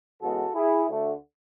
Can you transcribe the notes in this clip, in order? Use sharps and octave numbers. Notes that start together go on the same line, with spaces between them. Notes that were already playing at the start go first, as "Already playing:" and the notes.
E2 C#3 G#3 B3 F#4 A4
E4 G#4
D2 D3 A3